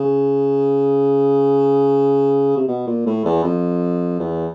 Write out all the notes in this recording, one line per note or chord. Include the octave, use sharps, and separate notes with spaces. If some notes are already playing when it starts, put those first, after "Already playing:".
Already playing: C#3
C3
B2
A#2
A2
E2
F2
E2